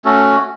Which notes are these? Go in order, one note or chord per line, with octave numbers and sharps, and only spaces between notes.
A3 C#4 F#4 A4